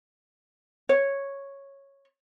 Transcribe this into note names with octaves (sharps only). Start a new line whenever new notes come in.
C#5